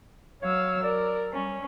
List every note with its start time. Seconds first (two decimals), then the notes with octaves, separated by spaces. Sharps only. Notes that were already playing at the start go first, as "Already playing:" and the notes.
0.42 F#3 C#5 F5 E6
0.83 A#4 D5
1.33 G3 C#4